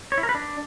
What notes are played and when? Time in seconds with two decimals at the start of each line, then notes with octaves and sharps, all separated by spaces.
0.12 C#5
0.18 E4
0.23 A#4
0.29 B4
0.35 D4